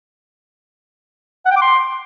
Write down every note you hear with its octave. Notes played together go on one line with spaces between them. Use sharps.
F#5
G5
D6
C6